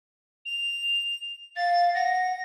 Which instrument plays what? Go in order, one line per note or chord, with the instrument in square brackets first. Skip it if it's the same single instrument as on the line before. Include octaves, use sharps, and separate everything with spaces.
[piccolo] F7
[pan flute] F5 [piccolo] A6
[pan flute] F#5 [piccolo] A#6